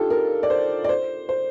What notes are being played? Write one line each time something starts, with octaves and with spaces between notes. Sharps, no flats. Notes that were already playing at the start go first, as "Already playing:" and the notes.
Already playing: D4 D#4 F4 G4 A4
A#4
D5
C5
D5
C5
C5